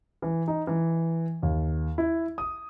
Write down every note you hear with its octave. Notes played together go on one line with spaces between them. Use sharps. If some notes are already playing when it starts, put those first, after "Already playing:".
E3
D#4
E3
D#2
E4
D#6